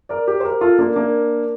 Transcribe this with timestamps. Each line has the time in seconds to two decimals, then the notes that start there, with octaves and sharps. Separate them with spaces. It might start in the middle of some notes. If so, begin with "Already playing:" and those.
0.09 A#4 D5
0.27 G4 A#4
0.40 C5
0.44 G4 A#4
0.61 F4 A4
0.79 A#3 D4
0.96 A#3 D4